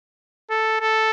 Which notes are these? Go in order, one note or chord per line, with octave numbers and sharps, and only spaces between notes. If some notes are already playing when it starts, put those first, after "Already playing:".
A4
A4